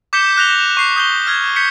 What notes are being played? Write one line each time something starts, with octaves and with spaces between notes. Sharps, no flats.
D6 G6 B6 C#7 E7 G7
F#6 A#6 F7 G7
C#6 C7
D#6 G6 C7 G7
F6 G#6
G6 B6 C#7